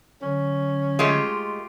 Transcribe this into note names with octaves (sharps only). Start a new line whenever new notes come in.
D3 F#3 C#4
G#3 A3 F4 G4